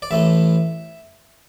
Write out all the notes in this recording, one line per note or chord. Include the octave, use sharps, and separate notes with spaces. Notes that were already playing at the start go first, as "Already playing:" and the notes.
D5
A1 A2 A3 E5